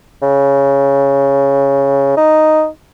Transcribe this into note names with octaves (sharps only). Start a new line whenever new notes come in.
C#3
D#4